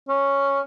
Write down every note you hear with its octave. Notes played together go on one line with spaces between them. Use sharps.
C#4